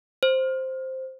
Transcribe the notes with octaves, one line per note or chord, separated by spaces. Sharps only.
C5